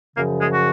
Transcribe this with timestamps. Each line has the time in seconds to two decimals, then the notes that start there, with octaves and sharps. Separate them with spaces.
0.17 F#2 C#3 F3 A#3
0.41 G#3
0.54 F#4